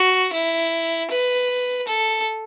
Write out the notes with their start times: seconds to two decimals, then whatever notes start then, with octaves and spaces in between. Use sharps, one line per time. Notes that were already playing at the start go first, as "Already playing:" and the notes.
Already playing: F#4
0.33 E4
1.11 B4
1.87 A4